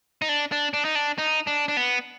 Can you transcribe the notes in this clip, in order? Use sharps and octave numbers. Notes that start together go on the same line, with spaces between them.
D#4
D4
D4
D4
D#4
D4
D#4
D4
D4
B3